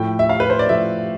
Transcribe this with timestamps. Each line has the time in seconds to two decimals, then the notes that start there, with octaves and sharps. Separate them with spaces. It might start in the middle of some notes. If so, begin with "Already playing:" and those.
Already playing: A2 F3 A3 G5
0.19 E5
0.29 F5
0.40 B4
0.50 C5
0.59 D5
0.69 A2 F3 A3 E5